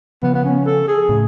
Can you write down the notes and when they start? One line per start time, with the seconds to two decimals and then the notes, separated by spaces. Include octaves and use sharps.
0.23 C#3 F3 B3
0.34 B3
0.45 C#4
0.66 A4
0.88 G#4
1.09 A2 C#3